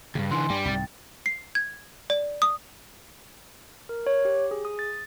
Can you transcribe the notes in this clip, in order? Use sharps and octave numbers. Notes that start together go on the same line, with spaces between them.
D2 G2 C#3
D3 E3 G#5 C6
G2 G3 G4
C2 G#2 G5 A6
C7
G#6
D5
D#6
A#4
C#5
G4
G#4
D#6
A6